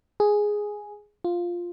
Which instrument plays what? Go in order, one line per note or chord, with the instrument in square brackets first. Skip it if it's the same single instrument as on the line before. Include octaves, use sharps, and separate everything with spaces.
[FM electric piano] G#4
F4